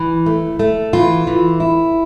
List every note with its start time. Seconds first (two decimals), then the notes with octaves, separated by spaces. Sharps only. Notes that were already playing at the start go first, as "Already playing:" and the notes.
Already playing: E3
0.26 A3
0.59 A3
0.93 E3 F4
1.27 E3
1.60 E4